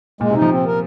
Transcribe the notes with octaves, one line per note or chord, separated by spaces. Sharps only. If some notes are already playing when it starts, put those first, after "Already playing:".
A#2 G#3
C3
D#4
F3
C4
A#4